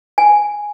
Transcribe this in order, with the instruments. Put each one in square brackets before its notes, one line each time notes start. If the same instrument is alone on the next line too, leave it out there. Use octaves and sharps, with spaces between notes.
[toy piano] G#5